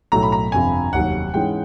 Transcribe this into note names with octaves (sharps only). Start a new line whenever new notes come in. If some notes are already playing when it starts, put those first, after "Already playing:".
B1 A2 F#3 A3 A#5
B5
A#5
G1 F2 C3 F3 G#5
F1 D#2 D#3 F#3 F#5
G#2 E3 G#3 C#4 G5